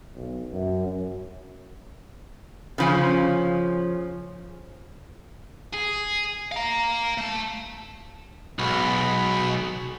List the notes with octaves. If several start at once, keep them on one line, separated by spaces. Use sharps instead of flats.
B1
F#2
C#3 F3 C#4
G#4
F5 A#5
A3 A5
B1 G#3 F#4 B5